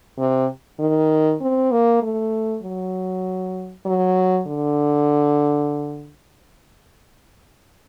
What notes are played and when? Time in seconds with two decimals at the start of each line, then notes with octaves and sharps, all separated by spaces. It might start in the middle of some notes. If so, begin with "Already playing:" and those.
0.19 C3
0.79 D#3
1.41 C4
1.71 A#3
2.02 A3
2.63 F#3
3.86 F#3
4.47 D3